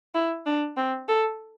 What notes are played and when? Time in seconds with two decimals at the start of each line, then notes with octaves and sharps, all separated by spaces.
0.15 E4
0.46 D4
0.77 C4
1.08 A4